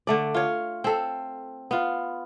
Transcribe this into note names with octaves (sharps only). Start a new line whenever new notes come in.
D3 A3 D5
F4 C#5
C4 A4
B3 F4